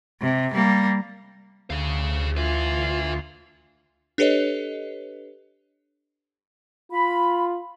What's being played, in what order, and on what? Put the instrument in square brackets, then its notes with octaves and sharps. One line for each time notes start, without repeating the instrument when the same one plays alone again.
[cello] C3
G3 A#3
[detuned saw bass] D2 [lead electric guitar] G#4 F5
[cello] F4 [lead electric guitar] B4 E5
[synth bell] D4 G4 A4 B4 C#5 D#5
[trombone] F4 [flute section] B5